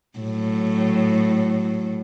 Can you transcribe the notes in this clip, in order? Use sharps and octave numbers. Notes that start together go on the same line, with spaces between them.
A2 F#3